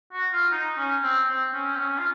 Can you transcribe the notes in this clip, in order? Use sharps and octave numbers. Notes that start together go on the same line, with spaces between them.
F#4
F4
D#4
C#4
C4
C4
C#4
C4
C#4
F4